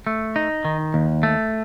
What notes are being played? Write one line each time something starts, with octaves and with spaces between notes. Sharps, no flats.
A3
D#4
D#3
D#2
A3